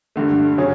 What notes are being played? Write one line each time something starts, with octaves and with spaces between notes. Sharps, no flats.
G2 D3 A3
C#3 F#3 C#4